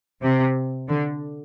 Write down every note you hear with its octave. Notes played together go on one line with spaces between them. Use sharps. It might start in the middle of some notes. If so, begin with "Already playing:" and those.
C3
D3